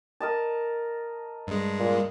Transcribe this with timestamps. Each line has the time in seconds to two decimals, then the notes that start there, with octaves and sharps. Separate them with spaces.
0.20 A#4 D#5 A5
1.47 G2 G#3
1.80 A#2